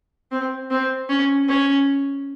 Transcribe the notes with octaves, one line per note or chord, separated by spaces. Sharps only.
C4
C4
C#4
C#4